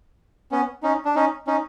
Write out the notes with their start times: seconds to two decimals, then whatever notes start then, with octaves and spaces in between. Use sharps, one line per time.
0.52 B3 C#4
0.83 C#4 D#4
1.05 D4
1.15 C#4 D#4
1.47 C#4 D#4